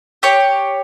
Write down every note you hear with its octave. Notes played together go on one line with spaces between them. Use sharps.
G4 C#5